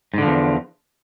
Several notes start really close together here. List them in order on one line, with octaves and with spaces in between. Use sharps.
G#2 D3 F3 E2